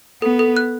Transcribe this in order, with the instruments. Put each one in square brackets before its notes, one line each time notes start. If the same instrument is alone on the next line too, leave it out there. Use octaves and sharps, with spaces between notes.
[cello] B3 [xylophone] A4
[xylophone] A4
F#6